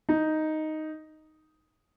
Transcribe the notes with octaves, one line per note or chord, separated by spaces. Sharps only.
D#4